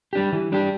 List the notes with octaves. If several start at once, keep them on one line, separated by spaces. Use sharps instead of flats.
G3 D4 G4
E3
G3 D4 G4